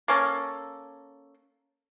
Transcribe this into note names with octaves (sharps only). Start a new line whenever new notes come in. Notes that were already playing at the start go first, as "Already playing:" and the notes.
A#3 C#4 A4